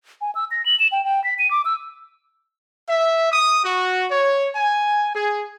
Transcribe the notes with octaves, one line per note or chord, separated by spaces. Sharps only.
G#5
E6
A#6
F#7
E7
G5
G5
B6
D#7
D6
E6
E5
D#6
F#4
C#5
G#5
G#4